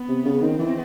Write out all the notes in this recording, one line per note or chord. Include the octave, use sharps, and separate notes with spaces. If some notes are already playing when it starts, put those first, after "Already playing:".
Already playing: B3
C3
C#3
D#3 C4
E3